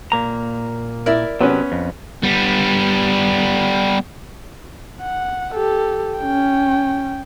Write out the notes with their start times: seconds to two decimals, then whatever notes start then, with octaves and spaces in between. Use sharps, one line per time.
0.12 A#2 A#3 A#5
1.06 E4 A#4 D5 E5
1.41 C3 F#3 B3 C#4
1.72 F2
2.23 G3 B3
5.02 F#5
5.55 G4 A4
6.18 C#4 G5